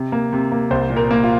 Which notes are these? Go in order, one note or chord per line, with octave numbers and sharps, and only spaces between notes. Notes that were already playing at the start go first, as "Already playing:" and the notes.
Already playing: C3
A#3
C3
A#3
C2 C5
A#2
A#4
A#3
F4